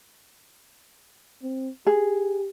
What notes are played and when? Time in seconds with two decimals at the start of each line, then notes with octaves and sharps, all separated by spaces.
1.42 C4
1.87 G4 G#4